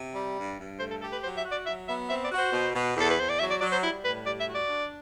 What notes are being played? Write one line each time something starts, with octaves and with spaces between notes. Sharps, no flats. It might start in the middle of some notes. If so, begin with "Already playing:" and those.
Already playing: C3
G3
G2
G2
A3 C5
A4
G4 A4
B4
F#3 C5
E5
F#4
D5
F#3 E5
B3 E5
C4 E5
D5
F#4
C5
B2
B2
E2 A4
B4
E2 C5
D5
F#3 E5
D5
F#3 D5
C5
G3 E4
A2 B4
G3 D5
E5
F#4
D5
D4